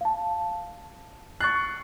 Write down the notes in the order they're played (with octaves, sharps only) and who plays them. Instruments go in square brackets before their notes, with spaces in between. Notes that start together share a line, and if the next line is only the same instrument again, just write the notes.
[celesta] F5 A5
[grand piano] C#6 F#6 [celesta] A6 C7